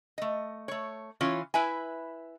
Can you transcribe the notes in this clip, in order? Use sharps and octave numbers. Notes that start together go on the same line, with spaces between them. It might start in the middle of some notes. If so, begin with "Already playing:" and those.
A3 D#5
A3 C#5
E3 C#4 F4 C#5
E4 B4 E5 G#5